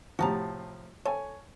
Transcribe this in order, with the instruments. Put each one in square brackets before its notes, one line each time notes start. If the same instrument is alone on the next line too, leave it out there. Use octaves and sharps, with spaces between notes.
[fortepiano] A2 C3 F3 [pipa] F#4 A5 A#5
[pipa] A4 [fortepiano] C#5 G#5